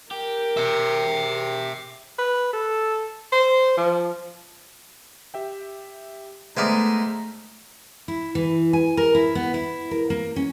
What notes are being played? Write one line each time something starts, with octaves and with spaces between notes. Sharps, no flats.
G4 A#4
E5 G5
B4
A4
C5
F3
G4 E5 G5
G#3 A3 B3 D#4 C5 D5 E5 F6
E4
E3
G#5
A#4
E4
B3
E4
A#4
A#3
C#4